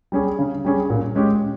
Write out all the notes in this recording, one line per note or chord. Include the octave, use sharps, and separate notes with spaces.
G3 C#4 G#4
C#3
G3 C#4 G#4
A#2
G#3 C#4 G4